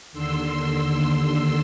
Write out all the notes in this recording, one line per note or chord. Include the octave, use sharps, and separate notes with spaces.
D#2 D3 C6 E6